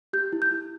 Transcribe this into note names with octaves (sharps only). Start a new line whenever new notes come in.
G4 G6
E4
G6
E4